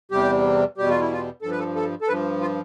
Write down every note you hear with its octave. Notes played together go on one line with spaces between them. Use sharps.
E2 C3 G3 G4
E2 B2 G3 G4
F4
E4
F4
G2 F3 A4
B4
A4
A4
A4
G2 F3 B4
F4